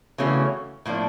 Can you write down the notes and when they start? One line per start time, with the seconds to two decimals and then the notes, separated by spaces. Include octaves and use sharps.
0.18 C#3 E3 A3 C#4 F#4
0.86 A2 F3 A#3 D4